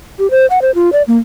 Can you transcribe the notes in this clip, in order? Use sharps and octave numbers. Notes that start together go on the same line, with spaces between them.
G4
C5
F#5
C5
F4
D5
A#3